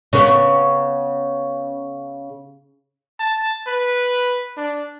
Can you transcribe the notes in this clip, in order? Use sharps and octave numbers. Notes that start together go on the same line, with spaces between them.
C#3 B3
A5
B4
D4